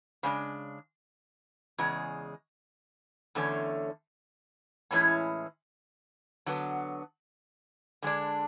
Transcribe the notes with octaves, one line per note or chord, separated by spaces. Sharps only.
C#3 G#3 D4
E2 C#3 G#3
E2 D3 A3 C#4
A2 E3 G#3 C#4 E4
D3 F#3 B3
D3 G#3 D4